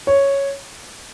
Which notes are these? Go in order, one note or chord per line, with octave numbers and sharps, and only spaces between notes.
C#5